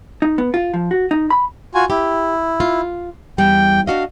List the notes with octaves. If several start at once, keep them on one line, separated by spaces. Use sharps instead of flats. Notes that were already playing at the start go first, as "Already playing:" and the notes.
D#4
B3
F4
F3
F#4
D#4
B5
F4 F#4 G#5
E4 G4
F4
E2 G3 G5
D4 F#4 D#5 F5